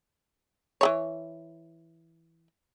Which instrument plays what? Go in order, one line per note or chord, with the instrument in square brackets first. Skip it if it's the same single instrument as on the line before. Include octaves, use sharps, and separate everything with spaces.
[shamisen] E3 A3 C#5